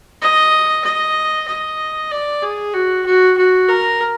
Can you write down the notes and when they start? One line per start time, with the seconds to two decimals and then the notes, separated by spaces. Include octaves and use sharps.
0.22 D#5
0.85 D#5
1.48 D#5
2.11 D5
2.43 G#4
2.74 F#4
3.06 F#4
3.38 F#4
3.69 A#4